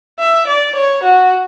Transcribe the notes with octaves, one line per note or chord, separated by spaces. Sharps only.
E5
D5
C#5
F#4